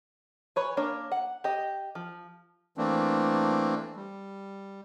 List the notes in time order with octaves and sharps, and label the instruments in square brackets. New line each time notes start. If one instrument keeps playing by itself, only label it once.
[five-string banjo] B4 C#5 G#5
A#3 D4 C#5
F#5
G4 D#5
F3
[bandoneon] E3 A3 A#3 C4 D4
G3